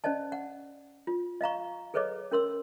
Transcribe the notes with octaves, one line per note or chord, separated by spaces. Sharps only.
C#4 C5 D5 D#5 A5
F#5
F4
D#5 F5 A#5 C#6
G#4 A4 B4 C#5 D#5 D6
C#4 A#4 C6 E6